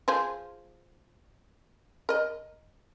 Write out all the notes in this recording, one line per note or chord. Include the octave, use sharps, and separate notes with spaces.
F3 G#4 C5
A#4 D#5